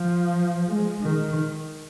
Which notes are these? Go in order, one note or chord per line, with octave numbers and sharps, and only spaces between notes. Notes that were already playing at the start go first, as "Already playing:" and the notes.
Already playing: F3
G#3
D#3